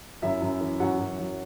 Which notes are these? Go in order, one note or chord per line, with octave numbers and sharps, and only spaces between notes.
F#2 E4 E5
F#2
E3
F#2 F#4 F#5
F#2
F#3